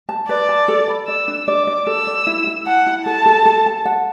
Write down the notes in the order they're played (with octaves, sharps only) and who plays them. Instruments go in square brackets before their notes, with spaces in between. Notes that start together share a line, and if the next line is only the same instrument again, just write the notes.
[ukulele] A5
[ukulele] B4 [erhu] D5
[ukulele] A5
A4
B5
[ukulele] D5 [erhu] E6
[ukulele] D4
[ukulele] D5 [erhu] D6
[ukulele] D5
[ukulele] A4 [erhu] E6
[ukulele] D5
E4
E4
[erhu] F#5 [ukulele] A5
[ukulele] E4
[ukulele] A4 [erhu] A5
[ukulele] A4
A4
A5
F#5